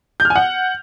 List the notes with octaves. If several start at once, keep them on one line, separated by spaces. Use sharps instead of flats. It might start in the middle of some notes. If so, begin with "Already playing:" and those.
G6
F6
G#5
F#5